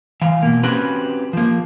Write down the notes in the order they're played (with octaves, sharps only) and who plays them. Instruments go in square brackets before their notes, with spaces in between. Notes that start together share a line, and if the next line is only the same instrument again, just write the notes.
[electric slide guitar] E3 F5
B2 A#3
C4 C#4 F#4 G4 B4
F3 A#3